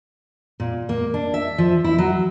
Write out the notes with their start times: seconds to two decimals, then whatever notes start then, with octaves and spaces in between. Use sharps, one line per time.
0.60 A#2
0.89 A#3
1.14 D4
1.34 E5
1.58 F3
1.84 E4
1.98 F#3